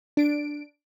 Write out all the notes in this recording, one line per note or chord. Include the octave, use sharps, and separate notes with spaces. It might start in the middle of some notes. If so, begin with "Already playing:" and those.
D4 D7